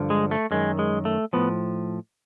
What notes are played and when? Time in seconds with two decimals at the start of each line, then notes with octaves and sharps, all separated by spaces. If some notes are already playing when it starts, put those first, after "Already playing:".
Already playing: G2 D3 F3
0.10 G#3
0.31 A3
0.51 F#2 D#3 G#3
0.79 G#3
1.05 A3
1.33 A2 F3 B3